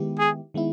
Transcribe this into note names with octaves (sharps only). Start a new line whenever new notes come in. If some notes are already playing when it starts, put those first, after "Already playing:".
Already playing: D#3 G#3 B3 E4 G4
G#4
D#3 G#3 B3 E4